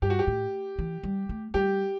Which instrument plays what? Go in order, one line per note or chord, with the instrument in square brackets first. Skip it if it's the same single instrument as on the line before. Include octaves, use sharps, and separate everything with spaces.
[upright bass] G2 [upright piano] G4
[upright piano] F#4
G4
[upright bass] A2
E3
G3
A3
[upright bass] G3 [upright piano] G4